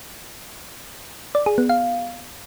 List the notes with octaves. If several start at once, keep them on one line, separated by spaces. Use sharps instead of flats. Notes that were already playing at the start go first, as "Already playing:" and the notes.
D5
G#4
B3
F5